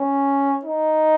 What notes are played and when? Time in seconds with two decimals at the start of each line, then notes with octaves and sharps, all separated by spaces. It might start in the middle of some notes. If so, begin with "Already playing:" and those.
Already playing: C#4
0.65 D#4